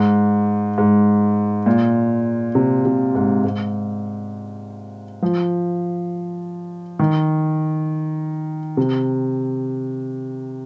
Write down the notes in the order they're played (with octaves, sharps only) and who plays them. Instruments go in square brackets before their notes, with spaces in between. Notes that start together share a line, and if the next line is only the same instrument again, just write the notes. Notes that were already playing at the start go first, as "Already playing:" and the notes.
Already playing: [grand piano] G#2
G#2
A#2
C3
C3
G#2
G#2
F3
D#3
C3